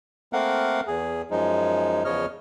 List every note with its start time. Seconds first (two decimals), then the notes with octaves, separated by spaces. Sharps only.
0.33 A3 A#3 C4 A#4 F5 F#5
0.87 E2 G#4
1.31 F#2 F3 G#3 D#4
2.05 E2 C#3 F3 C#5 D#5 F6